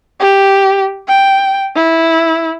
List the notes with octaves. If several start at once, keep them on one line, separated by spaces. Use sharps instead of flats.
G4
G5
E4